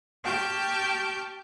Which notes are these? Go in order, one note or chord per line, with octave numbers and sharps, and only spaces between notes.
G4 G5 A5 C#6 F6 G6